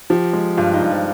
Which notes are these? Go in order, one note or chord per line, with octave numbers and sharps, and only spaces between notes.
F3 G4
G#3
G2 F4
D#4
G2
F3